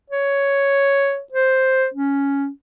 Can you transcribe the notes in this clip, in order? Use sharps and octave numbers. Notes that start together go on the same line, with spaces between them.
C#5
C5
C#4